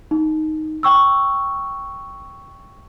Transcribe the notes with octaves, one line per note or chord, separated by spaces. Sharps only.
D#4
G5 C#6 E6